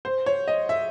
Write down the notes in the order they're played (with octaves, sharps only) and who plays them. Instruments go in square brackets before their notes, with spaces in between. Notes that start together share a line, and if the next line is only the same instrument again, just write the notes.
[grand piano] C5
C#5
D#5
E5